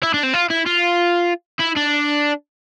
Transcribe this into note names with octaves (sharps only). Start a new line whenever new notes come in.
E4
D4
C4
F4
E4
F4
E4
D4